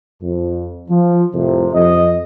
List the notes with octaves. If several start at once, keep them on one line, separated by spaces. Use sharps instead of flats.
F2
F3
C2 F2 A2 C3
F2 D#5